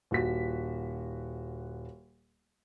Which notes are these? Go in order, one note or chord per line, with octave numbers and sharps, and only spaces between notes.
D#1 F#4 B6